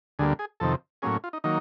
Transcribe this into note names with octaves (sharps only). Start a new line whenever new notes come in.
D2 D3 G3 A#3 G#4
G#4
F2 C3 D#3 A4
A2 F#3 A#3 C#4 G#4
F4
D#4
D#3 F#3 A#3 D#4